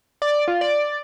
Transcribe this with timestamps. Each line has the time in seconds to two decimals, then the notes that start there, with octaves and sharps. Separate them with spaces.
0.22 D5
0.48 F4
0.61 D5